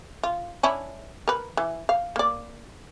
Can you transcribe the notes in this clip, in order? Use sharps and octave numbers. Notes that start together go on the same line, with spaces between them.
F4
C#4 D4 E4
A#4 B4
E3
F5
A#3 D5